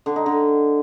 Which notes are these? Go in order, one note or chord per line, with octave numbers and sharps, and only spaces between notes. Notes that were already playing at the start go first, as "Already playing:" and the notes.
D3
D#4
D3